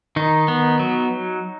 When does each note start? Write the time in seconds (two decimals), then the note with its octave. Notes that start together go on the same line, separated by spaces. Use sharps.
0.16 D#3 D#4
0.48 B3
0.79 F#3